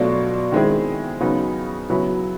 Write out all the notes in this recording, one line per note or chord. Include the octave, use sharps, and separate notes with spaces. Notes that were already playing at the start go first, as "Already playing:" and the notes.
Already playing: B2 F#3 A3 D4 F4
D#3 G#3 C4 E4 G#4
C#3 F#3 B3 D#4
C#3 F#3 B3 E4